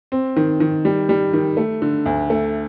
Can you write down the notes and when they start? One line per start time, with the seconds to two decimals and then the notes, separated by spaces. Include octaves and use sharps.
0.12 C4
0.37 D#3
0.60 D#3
0.85 G3
1.09 G3
1.33 D#3
1.57 A3
1.82 D3
2.06 D2
2.30 A3